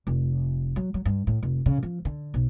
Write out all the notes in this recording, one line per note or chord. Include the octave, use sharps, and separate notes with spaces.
F1
F#3
F#3
G2
A2
F1
C#3
F3
D3
B1